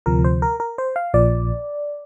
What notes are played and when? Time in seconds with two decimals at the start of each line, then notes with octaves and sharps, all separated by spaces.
0.06 D2 C3 F3 A#4
0.25 C5
0.42 A#4
0.60 A#4
0.78 C5
0.96 F5
1.14 A#1 A#2 F3 D5